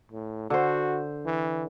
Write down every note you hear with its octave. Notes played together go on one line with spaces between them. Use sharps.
A2
D3 F#4 C5
E3